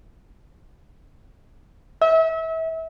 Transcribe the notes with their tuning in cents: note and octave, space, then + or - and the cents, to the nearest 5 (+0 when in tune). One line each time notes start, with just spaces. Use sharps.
E5 -35